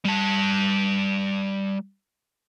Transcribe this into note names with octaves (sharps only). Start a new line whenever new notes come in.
G3 A5